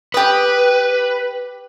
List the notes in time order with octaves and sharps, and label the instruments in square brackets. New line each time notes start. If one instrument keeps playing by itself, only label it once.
[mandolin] G4 D#6 [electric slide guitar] B4